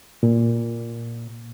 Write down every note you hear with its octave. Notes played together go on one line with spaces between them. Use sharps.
A#2